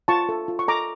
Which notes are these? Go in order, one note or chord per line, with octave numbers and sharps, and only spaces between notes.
F4 A5 C#6
A4
F4
C#6
A4 A#5 D6